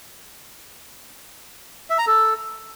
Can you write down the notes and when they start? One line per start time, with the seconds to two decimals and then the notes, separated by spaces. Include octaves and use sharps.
1.90 E5
1.98 A#5
2.07 A4